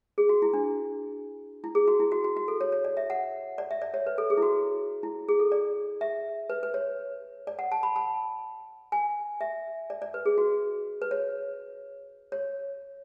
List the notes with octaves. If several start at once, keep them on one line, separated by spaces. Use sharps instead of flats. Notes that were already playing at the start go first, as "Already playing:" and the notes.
G#4
F#4
E4
D4
E4
G#4
F#4
E4
F#4
F#4
F#4
A4
C#5
C#5
D5
E5
F#5
D5
E5
D5
C#5
B4
A4
G#4
E4
F#4
E4
G#4
A4
D5
E5
B4
B4
C#5
D5
F#5
A5
B5
A5
G#5
E5
D5
D5
B4
G#4
F#4
B4
C#5
C#5